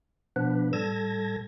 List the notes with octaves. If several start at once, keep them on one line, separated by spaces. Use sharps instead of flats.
B2 F3 B3 D4 B4
A2 G3 A4 A5 G#6 A#6